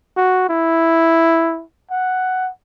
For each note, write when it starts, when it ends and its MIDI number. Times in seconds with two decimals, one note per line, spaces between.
0.17 0.47 66
0.49 1.63 64
1.91 2.50 78